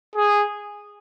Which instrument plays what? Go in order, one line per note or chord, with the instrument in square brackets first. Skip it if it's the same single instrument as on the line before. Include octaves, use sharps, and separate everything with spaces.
[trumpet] G#4